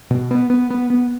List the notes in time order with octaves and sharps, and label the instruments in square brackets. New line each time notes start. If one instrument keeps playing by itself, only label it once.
[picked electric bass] B2
B3
B3
B3
B3